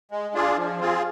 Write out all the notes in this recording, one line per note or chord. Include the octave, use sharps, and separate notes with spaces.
G#3
D4 F4 G#4
F3
C4 F4 G#4